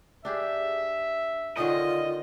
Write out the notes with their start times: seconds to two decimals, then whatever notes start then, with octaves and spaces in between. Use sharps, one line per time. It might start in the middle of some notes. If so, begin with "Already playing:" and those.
0.25 D4 G4 G#4 E5
1.57 D3 D#3 C#4 F4 D#5